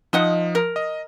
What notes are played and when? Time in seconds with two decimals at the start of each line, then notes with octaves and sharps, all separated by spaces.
0.13 F3 D#4 D#5 F#5
0.55 A#4
0.76 D#5